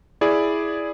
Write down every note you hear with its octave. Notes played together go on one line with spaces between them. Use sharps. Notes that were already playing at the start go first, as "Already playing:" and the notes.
E4 G#4 D5